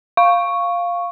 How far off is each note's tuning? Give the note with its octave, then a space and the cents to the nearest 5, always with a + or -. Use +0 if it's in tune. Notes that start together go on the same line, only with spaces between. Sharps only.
F5 +0 C#6 +0